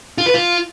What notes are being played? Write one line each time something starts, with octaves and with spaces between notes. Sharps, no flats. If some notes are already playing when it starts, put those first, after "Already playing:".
F4
B4
F4